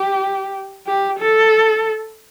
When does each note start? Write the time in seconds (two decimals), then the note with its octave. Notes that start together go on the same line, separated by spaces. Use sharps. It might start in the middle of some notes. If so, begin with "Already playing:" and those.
Already playing: G4
0.87 G4
1.19 A4